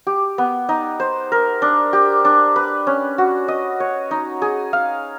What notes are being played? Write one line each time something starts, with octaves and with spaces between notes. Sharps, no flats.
G4
B3
D#4
C5
A#4
D4
G4
D4
B4
C#4
F#4
D#5
C#5
D#4
G#4
F5